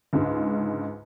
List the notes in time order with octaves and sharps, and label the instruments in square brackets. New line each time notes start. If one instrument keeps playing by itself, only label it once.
[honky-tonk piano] C#2 G#2 D3